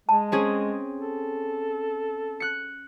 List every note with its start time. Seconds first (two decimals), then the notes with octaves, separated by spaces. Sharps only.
0.09 G#3 A5
0.32 C4 C#4 G#4
0.98 A4
2.40 F#6 C#7